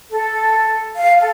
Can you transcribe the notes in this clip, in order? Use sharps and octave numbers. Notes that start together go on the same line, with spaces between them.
A4
F5
A4